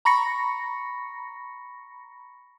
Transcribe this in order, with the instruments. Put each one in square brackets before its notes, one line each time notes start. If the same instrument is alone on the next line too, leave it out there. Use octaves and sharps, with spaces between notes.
[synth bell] A#5 B5 C#6 A#6 C#7